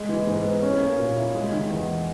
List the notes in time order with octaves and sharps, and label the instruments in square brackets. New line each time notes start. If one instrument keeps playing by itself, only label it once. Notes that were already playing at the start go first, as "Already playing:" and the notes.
Already playing: [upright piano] G#3
E3
G#2
B3
C#4
A#3
A#2
E4
G#3
D#3
E2